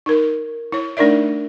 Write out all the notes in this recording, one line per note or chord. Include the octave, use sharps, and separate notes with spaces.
D#4 A#4
E4 C#5
A3 D4 D#4 A#4 D5 E5